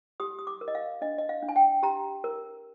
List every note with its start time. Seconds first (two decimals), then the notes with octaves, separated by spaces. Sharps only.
0.20 G4 D#6
0.39 D#6
0.47 D6
0.61 A#4
0.68 D#5
0.75 F5
1.02 D4 D#5
1.18 D#5
1.29 F5
1.43 D4
1.48 G#5
1.56 G5
1.83 G4 A#5
2.24 A#4